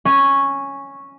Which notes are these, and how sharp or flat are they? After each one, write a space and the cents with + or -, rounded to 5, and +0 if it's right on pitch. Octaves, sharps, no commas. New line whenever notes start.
C#4 -5